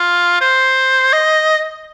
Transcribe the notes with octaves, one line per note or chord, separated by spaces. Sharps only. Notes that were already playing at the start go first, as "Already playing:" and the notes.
Already playing: F4
C5
D#5